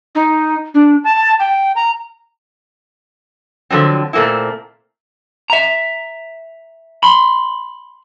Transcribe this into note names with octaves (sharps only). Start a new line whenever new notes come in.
D#4
D4
A5
G5
A#5
D3 F3 F#3 C4
A#2 A3 A#3 C4 E4
E5 A#5
B5 C6